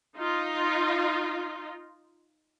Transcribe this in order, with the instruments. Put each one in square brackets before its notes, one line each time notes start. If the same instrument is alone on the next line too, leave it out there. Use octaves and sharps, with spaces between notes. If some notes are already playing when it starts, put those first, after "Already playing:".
[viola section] D#4 F4